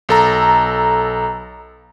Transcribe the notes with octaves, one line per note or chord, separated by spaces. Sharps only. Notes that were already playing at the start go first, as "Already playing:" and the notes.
B1 A4 A#5